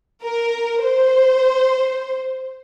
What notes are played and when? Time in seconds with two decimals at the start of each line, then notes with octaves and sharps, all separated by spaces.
0.24 A#4
0.83 C5